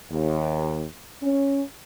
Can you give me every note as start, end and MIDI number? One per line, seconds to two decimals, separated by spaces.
0.11 0.83 39
1.22 1.61 61